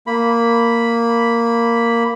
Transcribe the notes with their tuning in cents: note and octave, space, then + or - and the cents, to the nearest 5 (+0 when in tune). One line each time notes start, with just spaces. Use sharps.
A#3 -5 B5 +0